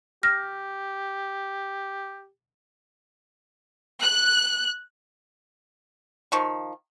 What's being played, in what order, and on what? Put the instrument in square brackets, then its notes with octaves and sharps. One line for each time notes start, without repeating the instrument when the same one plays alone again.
[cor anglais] G4 [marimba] F6 A#6
[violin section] F#6
[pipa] D#3 F3 C#6